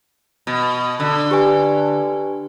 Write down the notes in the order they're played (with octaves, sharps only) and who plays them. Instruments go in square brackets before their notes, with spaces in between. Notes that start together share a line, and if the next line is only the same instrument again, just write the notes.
[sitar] B2
D3
[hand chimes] G4 B4 G#5